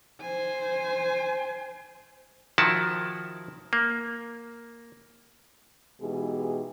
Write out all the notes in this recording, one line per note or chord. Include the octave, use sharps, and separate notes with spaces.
C5 G#5
D#3 F3 E4 F#4 A5
A#3
B2 E3 G#3 D#4 G4 G#4